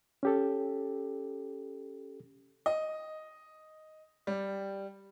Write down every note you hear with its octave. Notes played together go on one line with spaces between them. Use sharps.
C#4 G4 A4
D#5
G3